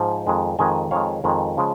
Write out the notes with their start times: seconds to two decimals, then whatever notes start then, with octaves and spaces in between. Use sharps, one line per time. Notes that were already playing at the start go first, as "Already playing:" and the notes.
Already playing: G#2 F3
0.27 F2 D#3 G#3
0.59 F2 D#3 G#3 D#5 G#5
0.91 F2 D#3 G#3 C#5 F5
1.24 F2 D#3 G#3
1.57 C#3 F3 G#3